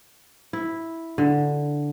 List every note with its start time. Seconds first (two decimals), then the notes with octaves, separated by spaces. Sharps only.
0.53 E4
1.18 D3